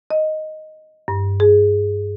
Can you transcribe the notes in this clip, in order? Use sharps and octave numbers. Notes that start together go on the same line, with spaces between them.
D#5
G2
G#4